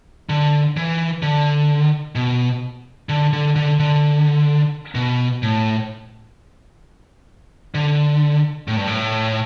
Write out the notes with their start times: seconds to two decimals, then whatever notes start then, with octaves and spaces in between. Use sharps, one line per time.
0.29 D3
0.77 E3
1.23 D3
2.15 B2
3.09 D3
3.33 D3
3.56 D3
3.79 D3
4.95 B2
5.43 A2
7.75 D3
8.68 A2
8.77 G2
8.87 A2